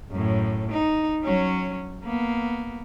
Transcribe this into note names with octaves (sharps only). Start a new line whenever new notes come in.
F#2 A2
D#4
F#3 C#4
A#3 B3